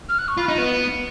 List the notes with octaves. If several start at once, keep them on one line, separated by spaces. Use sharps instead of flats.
F6
F#6
C#6
F4 B5
D#4
B3